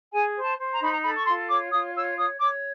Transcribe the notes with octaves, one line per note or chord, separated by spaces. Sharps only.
G#4 G#5
C5
A5
C5
A#5
D#4 B5
A#5
A4 B5
C#6
F4 C6
C#5 D6
F4 D#6
C#5 E6
C#5 D#6
C#5 D6